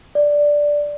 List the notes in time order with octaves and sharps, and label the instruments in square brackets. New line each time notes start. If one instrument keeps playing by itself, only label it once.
[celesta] D5